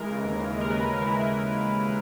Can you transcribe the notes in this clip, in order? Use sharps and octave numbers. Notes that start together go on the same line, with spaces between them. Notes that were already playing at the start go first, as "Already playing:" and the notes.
Already playing: E3 G#3 A#4
C#3
D#2
E3
G#3
A#4
C#3 B4
D#2
A#4
E3 E4